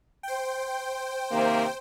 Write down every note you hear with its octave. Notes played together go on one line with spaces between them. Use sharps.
C5 G5
C3 D#3 A#3